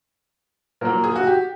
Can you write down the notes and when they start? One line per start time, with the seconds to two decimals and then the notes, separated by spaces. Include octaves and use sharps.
0.81 A#2 F#3 A#3 A#4
1.04 G#4
1.16 F#4
1.27 G4